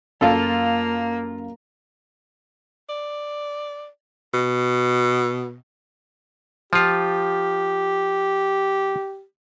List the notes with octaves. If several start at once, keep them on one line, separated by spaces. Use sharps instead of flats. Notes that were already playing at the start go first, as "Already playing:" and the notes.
F#2 A#3 F4 A4 F5
D5
B2
F3 F4 G4